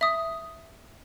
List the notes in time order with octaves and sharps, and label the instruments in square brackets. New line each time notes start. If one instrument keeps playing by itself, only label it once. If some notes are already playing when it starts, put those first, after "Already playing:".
[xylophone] E5 D#6